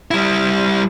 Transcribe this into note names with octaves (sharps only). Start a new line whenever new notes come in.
G3 E4